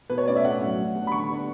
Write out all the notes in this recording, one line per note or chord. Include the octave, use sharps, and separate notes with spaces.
B2 B4
C#5
A3 C#4 D5
E5
A2 F#5
F#3 C#4
A2
G3 B3 D4
B5
D3 C#6
G3 B3 D4